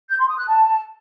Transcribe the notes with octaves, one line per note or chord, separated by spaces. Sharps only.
G6
C6
D#6
F#6
A5